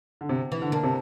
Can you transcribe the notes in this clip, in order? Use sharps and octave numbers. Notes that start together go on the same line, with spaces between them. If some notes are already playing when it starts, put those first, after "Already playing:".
D3
C3
E3
D3
A#3 D4
C3